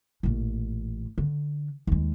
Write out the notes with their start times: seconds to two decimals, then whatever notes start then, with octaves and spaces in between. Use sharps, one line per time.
0.23 A1 A#2
1.18 D3
1.87 D#2 G#3